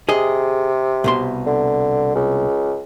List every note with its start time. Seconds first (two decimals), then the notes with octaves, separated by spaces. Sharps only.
0.09 C3 G#4 D#5
1.04 C2 B2 C6
1.46 D3
2.15 C#2